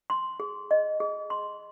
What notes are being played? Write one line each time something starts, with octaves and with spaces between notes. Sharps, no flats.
C6
G#4
D#5
G#4
C6